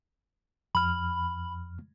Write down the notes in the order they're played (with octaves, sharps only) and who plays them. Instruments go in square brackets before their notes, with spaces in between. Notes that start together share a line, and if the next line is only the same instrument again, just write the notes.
[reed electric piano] F2 F6 [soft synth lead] B5